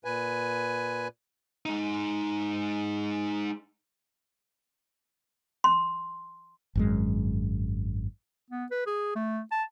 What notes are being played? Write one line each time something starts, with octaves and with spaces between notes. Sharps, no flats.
A#2 B4 G#5
G#3 D#4
C6
G#1 F#2 G#3
B3
B4
G#4
A3
A5